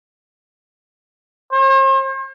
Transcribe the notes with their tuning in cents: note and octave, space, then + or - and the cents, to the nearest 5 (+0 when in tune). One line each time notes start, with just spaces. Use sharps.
C5 +45